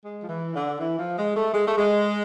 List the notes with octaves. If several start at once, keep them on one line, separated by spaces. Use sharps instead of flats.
G#3
F3
E3
D3
E3
F3
G#3
A3
G#3
A3
G#3